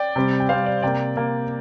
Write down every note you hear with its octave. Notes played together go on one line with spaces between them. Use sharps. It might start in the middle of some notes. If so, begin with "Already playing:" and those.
Already playing: D5 G5
C3 G3 C4
G5
C3 G3 C4 C5 F5
D5
C3 A#3 D5 G5
C3 A#3